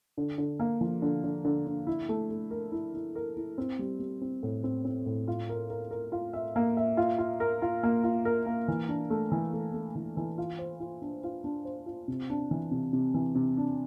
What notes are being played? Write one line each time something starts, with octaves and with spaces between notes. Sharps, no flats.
D3
D3
A#3
F3
D3
D3
D3
D3
E4
A3
A3
A#4
E4
E4
A#4
E4
C4
G3
G3
C4
A2
C4
C4
A2
F4
A#4
A#4
A#4
F4
E5
A#3
E5
F4
F4
A#4
F4
A#3
F4
A#4
A#3
E3
D4
A3
E3
A3
A3
E3
E3
F4
C5
F4
D4
F4
D4
C5
F4
C3
D4
E3
C3
C3
E3
C3
D4